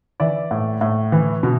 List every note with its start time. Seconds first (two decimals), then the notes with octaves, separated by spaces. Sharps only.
0.20 E3 D5 E5
0.51 A2
0.81 A2
1.12 E3
1.43 B2